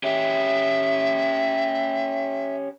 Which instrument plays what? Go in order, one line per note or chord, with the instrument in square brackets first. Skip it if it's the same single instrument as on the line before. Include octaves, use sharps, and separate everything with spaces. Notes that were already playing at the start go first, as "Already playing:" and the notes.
[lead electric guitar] C#4 G4 [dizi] E5